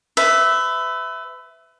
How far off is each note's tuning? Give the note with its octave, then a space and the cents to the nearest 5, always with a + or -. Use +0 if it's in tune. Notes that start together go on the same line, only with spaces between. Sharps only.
B4 +30 E5 +0